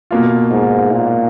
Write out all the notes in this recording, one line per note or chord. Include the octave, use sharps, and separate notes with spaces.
B2 A#3 F4
G#2
A#2